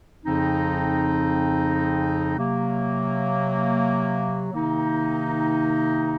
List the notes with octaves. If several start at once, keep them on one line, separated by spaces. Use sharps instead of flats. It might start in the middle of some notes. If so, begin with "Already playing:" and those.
F2 C#3 F3 C4 D#4
C3 F#3 A#3
C3 D#3 A#3 D#4